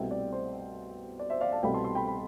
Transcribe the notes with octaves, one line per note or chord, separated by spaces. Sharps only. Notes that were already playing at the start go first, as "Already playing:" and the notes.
Already playing: C2 B2 A3 C4 E5 G5
D5
C5
D5
C5 E5
D5 F5
F5 A5
C2 B2 A3 C4 G5 B5
A5 C6
A5 C6
G5 B5
G5 B5